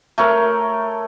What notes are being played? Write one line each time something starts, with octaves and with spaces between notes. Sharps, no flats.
A3 A#4 C#5